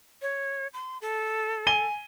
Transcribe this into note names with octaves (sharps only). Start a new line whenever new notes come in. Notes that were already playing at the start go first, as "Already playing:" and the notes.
C#5
C6
A4
G#5 D#7 G7